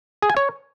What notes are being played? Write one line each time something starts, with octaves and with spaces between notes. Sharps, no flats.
G#4
G#5
C#5